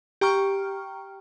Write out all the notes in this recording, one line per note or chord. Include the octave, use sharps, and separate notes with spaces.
G4 G5 A#5 C#6 F6